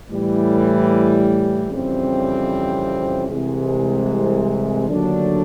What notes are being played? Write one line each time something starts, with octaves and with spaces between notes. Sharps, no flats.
A2 E3 G3
F2 C#3 E3 G3 C4
C2 C3 E3 G#3
D#2 D3 F#3 A3 D4